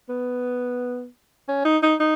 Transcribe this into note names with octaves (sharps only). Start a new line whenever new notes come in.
B3
C#4
D#4
D#4
D#4